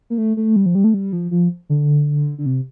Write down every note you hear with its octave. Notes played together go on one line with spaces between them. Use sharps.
A#3
A3
A3
G3
F3
G3
A3
G3
F3
F3
D3
D3
C3